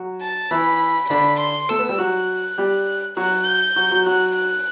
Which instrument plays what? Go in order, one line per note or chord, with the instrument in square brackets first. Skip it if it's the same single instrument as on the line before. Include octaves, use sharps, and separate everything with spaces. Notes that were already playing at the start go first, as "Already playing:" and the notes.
Already playing: [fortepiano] F#3 F#4
[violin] A5
[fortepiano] E3 E4 [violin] B5
[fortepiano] D3 D4 [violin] B5
[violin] C6
[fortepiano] A3 A4 [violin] E6
[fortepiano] B3 B4
G3 G4
[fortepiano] F#3 F#4 [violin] F#6
[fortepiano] G3 G4
[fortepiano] F#3 F#4 [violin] F#6
[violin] G6
[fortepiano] F#3 F#4
F#3 F#4
[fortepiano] F#3 F#4 [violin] F#6
[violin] F#6